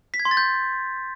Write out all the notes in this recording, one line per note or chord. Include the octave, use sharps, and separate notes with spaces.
B6
G#6
C6
A6
G6